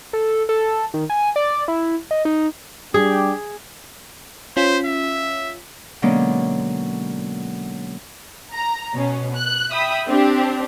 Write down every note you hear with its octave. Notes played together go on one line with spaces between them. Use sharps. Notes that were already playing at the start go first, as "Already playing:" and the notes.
A4
A4
D#3
G#5
D5
E4
D#5
D#4
G3 D4 G4 G#4
C#4 F4 C5 B6
E5
B2 D3 F#3 G#3 A#3 C#4
A#5
B2 C#4
F#6
E5 G5 B5 D#6
C4 D4 G4